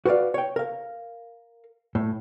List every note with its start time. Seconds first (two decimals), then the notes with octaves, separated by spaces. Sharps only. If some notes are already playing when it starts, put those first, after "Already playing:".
0.05 F#4 B4 C5 D5 F5
0.34 C#5 G5
0.56 A#4 F5
1.95 A2